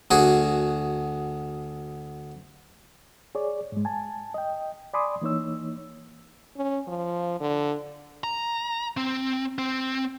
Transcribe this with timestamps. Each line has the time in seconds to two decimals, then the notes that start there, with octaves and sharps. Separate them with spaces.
0.11 D2 F#4 G#4
3.35 G#4 C#5 D5
3.72 G#2 G#3
3.85 G#5 A5
4.34 D#5 G5
4.93 D5 G#5 B5 C6 D6 D#6
5.22 E3 A#3 D#4 C#5 E6
6.57 C#4
6.88 F3
7.40 D3
8.24 A#5
8.97 C4
9.58 C4